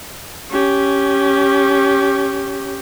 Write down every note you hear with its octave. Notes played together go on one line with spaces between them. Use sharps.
C#4 G4